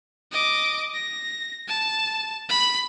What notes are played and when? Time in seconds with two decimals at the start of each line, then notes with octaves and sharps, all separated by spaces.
0.32 D#5 D6
0.94 A#6
1.68 A5
2.49 B5